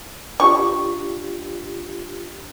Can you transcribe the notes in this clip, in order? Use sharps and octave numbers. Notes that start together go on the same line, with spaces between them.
D4 F4 G4 C#6